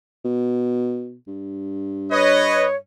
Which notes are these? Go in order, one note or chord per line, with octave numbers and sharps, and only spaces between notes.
B2
G2
B4 C#5 D#5